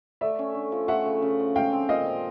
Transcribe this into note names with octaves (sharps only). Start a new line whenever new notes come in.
A3 D5 E5
C#4
D3
F3
A3 E5 F#5
C#3
C#3
F3
G#3 F5 G5
C4
A#2 D#5 F5
F3